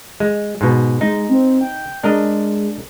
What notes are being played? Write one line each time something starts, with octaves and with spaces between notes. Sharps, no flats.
G#3
G#2 B2
G#3 D#4
C4
G5
G#3 D4 A#4 D#5